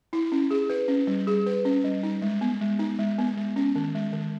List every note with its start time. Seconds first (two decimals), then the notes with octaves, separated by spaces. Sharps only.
0.13 E4
0.32 C#4
0.51 G#4
0.70 B4
0.88 C#4
1.07 G3
1.27 G#4
1.46 B4
1.65 C#4
1.84 G3
2.03 D#4
2.22 G#3
2.41 B3
2.61 G#3
2.79 D#4
2.99 G#3
3.18 B3
3.37 G#3
3.56 C#4
3.76 D#3
3.95 G#3
4.13 D#3